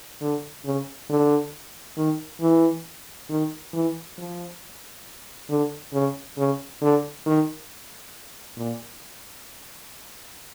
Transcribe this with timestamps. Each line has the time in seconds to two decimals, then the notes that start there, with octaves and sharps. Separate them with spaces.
0.21 D3
0.65 C#3
1.09 D3
1.97 D#3
2.41 E3
3.29 D#3
3.73 E3
4.18 F3
5.49 D3
5.93 C#3
6.37 C#3
6.81 D3
7.26 D#3
8.58 A#2